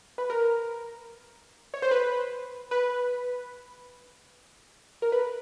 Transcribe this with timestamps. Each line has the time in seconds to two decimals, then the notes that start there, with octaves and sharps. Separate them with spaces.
0.18 B4
0.30 A#4
1.74 C#5
1.82 C5
1.91 B4
2.71 B4
5.02 A#4
5.12 B4